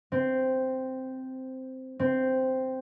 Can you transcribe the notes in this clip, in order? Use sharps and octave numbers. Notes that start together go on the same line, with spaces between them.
C4
C4